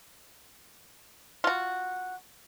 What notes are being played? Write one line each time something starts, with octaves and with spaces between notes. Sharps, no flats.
F4 F#4